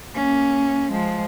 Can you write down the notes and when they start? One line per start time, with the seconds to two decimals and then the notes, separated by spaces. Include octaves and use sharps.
0.15 A#3 C#4
0.91 F3 G#3